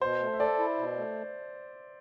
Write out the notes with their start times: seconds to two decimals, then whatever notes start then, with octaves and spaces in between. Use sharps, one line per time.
0.01 B2 C5
0.21 A3
0.33 E5
0.40 A4 D5
0.59 E4
0.78 B2
0.97 A3